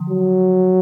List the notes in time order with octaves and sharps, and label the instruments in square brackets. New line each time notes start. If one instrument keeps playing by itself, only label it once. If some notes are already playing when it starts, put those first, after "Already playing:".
Already playing: [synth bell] D3 F3
[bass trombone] F#3